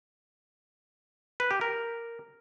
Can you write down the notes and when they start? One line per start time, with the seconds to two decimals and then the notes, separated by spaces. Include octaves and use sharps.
1.40 B4
1.51 G4
1.61 A#4